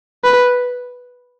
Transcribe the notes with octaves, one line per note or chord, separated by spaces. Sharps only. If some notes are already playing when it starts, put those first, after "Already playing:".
B4